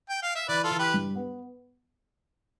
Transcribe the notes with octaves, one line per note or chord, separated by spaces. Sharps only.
G5
F5
E5
E3 B4 D5
F4 A4
E3
G4 B4
G2
B3